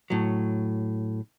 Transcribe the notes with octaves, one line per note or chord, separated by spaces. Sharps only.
A2 F#3